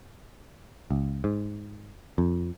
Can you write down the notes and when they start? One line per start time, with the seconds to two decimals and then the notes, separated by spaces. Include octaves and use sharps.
0.91 C#2
1.24 G#2
2.18 F2